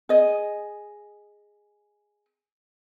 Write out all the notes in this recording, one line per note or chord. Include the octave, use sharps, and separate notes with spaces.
G#4 D#5